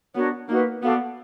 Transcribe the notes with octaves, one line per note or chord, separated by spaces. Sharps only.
B3 D4 F#4 A#4 C#5
A#3 D#4 F#4 B4
B3 F#4 A4 D5 F5